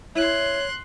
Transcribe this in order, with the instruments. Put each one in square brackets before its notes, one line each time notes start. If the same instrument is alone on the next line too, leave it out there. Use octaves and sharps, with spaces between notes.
[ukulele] E4 [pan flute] C#5 [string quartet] C6 F#6